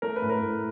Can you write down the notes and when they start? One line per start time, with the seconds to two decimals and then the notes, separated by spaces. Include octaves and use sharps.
0.02 A3 A#4
0.16 B4
0.22 A2
0.30 A#4
0.42 A2